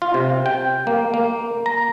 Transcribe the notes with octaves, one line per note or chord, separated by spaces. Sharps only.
F4
C3
G5
A#3
A#3
A#5